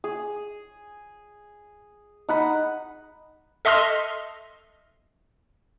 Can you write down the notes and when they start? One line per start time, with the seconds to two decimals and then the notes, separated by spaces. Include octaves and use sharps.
0.04 G#4
2.29 D#4 F#5 B5
3.65 A4 D#5 E5 C6 F6